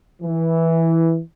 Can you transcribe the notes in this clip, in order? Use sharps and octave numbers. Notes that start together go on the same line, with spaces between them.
E3